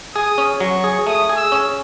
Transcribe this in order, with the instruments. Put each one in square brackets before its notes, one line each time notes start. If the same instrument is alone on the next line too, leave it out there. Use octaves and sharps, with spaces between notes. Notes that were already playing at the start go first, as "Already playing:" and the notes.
[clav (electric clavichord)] G#4 [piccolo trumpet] D#6
[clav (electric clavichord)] C#4
[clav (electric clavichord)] F#3 [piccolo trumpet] C#6
[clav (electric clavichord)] G#4
[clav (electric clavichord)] A3 [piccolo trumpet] D#6
[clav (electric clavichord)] G#4
[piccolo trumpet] E6
[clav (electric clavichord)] C#4